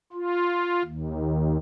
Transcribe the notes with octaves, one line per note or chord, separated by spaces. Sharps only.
F4
D#2